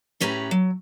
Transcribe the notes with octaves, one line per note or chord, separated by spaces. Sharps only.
A2 C#4 G4 B4 A#5
F#3